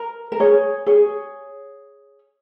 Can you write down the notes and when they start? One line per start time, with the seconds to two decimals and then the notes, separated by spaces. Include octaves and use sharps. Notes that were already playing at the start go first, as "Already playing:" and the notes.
Already playing: A#4
0.32 A#4
0.40 G#4 C#5
0.86 G#4 C#5